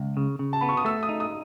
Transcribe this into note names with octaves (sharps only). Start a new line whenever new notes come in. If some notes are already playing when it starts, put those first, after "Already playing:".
Already playing: C#2
C#3
C#3
A5
B3 B5
C#6
D#6
A3 E6
D#6
D#4
D#6